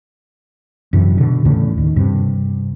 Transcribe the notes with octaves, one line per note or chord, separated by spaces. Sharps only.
F#2 C3 E3
B2 D3
E2 A2 C#3
D#2
G2 C3